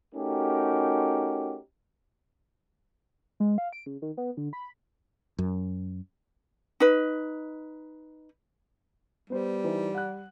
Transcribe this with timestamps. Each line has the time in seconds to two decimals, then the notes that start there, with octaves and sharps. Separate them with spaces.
0.15 A3 C#4 D#4 F#4 G4 A#4
3.40 G#3
3.58 F5
3.73 D7
3.86 C#3
4.02 D#3
4.17 B3
4.37 D3
4.53 B5
5.39 F#2
6.80 D#4 B4
9.30 G3 B3 C5
9.64 E3 D#4 C5
9.95 F#5 F#6